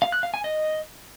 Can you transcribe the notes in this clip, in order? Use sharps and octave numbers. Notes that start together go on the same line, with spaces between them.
F5
F#6
F5
G#5
D#5